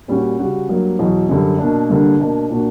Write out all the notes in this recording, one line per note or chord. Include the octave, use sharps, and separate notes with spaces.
A#2 G3 C#4 F#4
C#3 G3 C#4 F#4
G2 F#3 A#3
E2 B2 F#3
F#2 D3 G3
B2 A#3 D4
G2 D3 G3 A#3 D4
B2 A#3 D4 A#4
A#2 A#3 D4 F#4